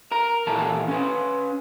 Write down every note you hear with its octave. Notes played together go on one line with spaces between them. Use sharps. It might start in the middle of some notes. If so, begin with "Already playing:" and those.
A#4 A#5
A#2 E3 A4 A5
C#4 B4